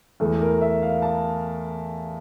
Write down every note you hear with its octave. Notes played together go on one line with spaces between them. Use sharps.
E2 E3 A3 A4
A#4
E5
F5
A5